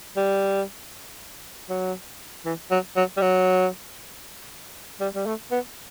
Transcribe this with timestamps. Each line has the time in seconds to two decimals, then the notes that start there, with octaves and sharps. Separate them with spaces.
0.17 G3
1.70 F#3
2.45 E3
2.71 F#3
2.96 F#3
3.17 G3
3.22 F#3
5.00 G3
5.15 G3
5.26 A3
5.51 B3